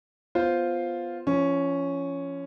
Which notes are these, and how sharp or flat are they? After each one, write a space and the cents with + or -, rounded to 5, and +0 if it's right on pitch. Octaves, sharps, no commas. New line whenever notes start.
B3 +0 F4 +0 C5 +0
F3 -30 C#4 +0